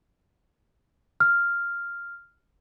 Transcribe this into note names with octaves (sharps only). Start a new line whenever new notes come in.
F6